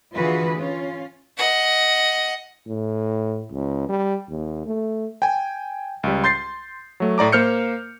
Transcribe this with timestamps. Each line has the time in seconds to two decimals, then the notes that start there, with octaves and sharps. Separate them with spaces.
0.15 D3 E3 F4 F#4 G#4 B4
0.57 C#4 F4
1.37 D#5 F#5
2.67 A2
3.52 C#2
3.89 G3
4.29 D#2
4.66 A3
5.22 G5 G#5
6.03 C#2 G3
6.24 C6 G6 A6 C7
7.00 F#3 A3
7.18 A2 D5 A#5 D6
7.32 A#3 C5 F6 G6 C#7